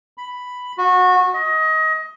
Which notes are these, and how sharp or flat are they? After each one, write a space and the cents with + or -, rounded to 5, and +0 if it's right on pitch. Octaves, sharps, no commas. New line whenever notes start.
B5 +5
F#4 -20
D#5 +25